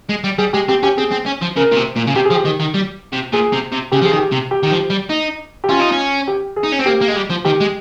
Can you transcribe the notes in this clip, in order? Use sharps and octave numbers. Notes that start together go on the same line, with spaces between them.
G#3
G3
G3 G#4
G#3 G4
C4 G4
C#4 G4
C4 G#4
C4
C#4
F3
C#3 A#4
A#2
C3
A#2
C#3
C3 G4
G#4
F3
G4
D#3
D#3
G3
C3
A#2 G#4
C3
C3
C#3 G4
F3 G#4
D#3
G4
C3
G4
D#3
F3
G3
D#4
G4
C#4 F4
D#4
C#4
G4
G#4
D#4
C#4
C4
A#3 G4
A#3
G#3
G3
F3
D#3 G4
G#3